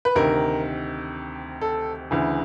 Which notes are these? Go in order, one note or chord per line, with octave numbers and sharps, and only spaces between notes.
B4
D2 C3 D#3 A#4
A4
D2 C#3 E3